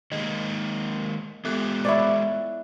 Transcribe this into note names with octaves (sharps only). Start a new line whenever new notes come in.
D#3 G#3 A#3 D#5
G#3 B3 F4 G4 A4 F#6
E4 C#5 D5